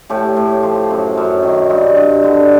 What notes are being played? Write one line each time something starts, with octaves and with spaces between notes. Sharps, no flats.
A2 G4 A4
A2
F3
F#2
F#2
D#3
G2
G2
D3